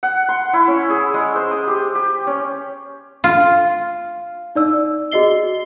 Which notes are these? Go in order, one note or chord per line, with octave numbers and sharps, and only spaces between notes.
F#5
C6
E4
C#4
G#4
G#3
C5
D#6
G4
G4
C#4
F4
D#4 D5 E6
F#4 G#4 D#5 C7 G7